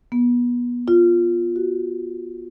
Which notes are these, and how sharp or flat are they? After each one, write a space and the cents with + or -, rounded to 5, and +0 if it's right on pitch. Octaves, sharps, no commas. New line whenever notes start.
B3 -25
F4 +0
F#4 +20